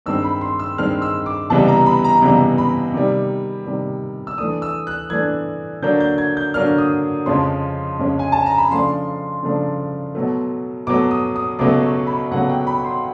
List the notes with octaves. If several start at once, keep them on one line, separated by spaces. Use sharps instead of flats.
G2 D#3 G#3 C4 E6
B5
C6
E6
G2 D#3 G#3 C4 F6
E6
D6
C#2 C3 E3 G3 B3 A5
A#5
B5
A#5
C#2 C3 E3 G3 B3 A#5
B5
C3 D#3 G3
C3 D#3 G3
E6
E3 A3 D4 D#6
E6
F#6
E3 A3 D4 G#6
D3 F#3 A#3 D4 G6
G6
G#6
G6
D3 F#3 A#3 D4 F6
D#6
F2 C#3 F3 G#3 C#4 C6
F2 C#3 F3 G#3 C#4
G#5
A5
A#5
B5
C#3 F3 A3 D4 C6
C#3 F3 A3 D4
B2 F#3 A3
B2 F#3 A3 D6
D#6
D#6
C#2 B2 F#3 A3 D6
C#6
B5
C#2 B2 F#3 A3 F#5
G5
B5
C6